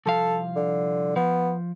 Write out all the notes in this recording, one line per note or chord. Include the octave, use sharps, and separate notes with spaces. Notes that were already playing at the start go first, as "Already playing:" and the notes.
C2 F3 A4 F5
D3
F3 B3